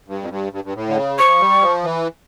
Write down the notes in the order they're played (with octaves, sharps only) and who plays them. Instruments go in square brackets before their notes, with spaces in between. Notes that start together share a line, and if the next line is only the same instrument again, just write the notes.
[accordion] G2
F2
G2
G2
G2
A2
D3
C#3
[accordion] F3 [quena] C#6
[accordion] G3
F3
E3